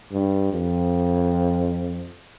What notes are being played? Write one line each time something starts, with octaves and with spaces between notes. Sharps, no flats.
G2
F2